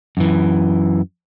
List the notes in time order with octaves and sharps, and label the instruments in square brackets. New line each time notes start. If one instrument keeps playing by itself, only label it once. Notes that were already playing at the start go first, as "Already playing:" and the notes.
[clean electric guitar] F#2 E3